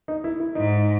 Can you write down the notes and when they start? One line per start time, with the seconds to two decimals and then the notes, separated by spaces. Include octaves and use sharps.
0.08 D#4
0.24 E4
0.40 E4
0.55 G#2 D#4